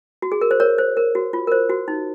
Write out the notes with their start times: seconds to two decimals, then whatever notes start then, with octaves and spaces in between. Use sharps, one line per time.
0.22 F#4
0.32 G#4
0.41 A#4
0.51 C5
0.60 A#4 C#5
0.78 C5
0.97 A#4
1.15 F#4
1.33 F4
1.47 A#4
1.52 C5
1.70 F#4
1.88 D#4